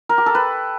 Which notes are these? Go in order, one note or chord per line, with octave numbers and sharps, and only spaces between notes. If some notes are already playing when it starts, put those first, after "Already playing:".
A#4
G4
A4
B4